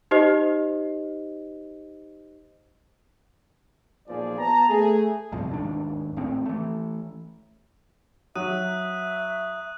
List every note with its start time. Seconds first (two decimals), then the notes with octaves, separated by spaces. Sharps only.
0.11 D#4 G4 C5 D#5
4.08 B1 A#2 F3 G#4 D5
4.39 B3 A5 A#5
4.69 A3 G#4
5.32 A1 G2 C3 F3
5.50 D1 D#2 G#2 D4
6.16 G#1 A2 C4
6.46 E3 A3
8.36 F#3 E5 D#6 F#6 D#7